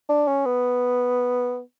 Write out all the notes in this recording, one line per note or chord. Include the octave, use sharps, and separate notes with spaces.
D4
C#4
B3